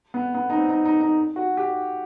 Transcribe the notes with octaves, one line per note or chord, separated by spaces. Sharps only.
B3
B3
D#4
C4
D#4
D#4
D#4
F#4
G4